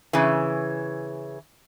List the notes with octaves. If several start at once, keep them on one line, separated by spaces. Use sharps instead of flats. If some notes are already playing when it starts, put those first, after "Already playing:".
C#3 E3